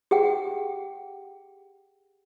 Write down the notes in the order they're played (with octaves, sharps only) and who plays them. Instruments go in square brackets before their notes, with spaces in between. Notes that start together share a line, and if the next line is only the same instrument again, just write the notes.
[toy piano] G4 G#4 F#5 G5